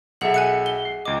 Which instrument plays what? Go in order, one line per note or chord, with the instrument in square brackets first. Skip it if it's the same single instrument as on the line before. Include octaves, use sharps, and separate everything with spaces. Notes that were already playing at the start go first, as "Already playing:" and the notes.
[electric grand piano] B1 A4 E5 [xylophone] G#4 F#5 F#7
[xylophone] G#5 F#6 C#7
G7
[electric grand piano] C7
[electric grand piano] C#2 D#5 [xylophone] D6